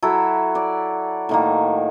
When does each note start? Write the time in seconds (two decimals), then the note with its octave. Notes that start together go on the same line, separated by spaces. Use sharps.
0.03 F#3 E4 A4
0.55 D5
1.29 A2 D#3 A#3